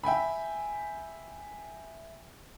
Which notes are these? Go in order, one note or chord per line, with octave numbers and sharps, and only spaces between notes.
E5 G5 G#5 B5